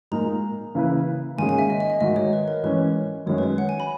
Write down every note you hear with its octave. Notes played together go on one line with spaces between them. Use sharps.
A#2 G#3 D#4 A#4 A#5
C#3 E3 A#3 E4 B4
G#2 D#3 A#3 C#4 G#4 G#5
G#5
E5
D#5
D#5
E5
G#2 D#3 G#3 D#4 F#4 D#5
C#5
B4
A#4
E3 G#3 C#4 B4
F#2 D#3 G#3 C#4 C#5
B4
C#5
F#5
G#5
B5